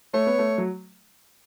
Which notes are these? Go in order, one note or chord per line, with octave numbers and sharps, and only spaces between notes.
A3 C#5
B3
A3
F#3